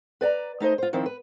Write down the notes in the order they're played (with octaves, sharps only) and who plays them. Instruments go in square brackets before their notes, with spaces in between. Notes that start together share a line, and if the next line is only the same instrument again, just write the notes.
[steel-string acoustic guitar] B4 D5 G#5 A#5
A3 D#4 C5 D#5
F4 C5
D#3 F3 C4 E4
B4